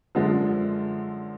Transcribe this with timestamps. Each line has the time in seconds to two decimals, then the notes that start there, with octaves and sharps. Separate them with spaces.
0.15 F#2 D3 F3 G#3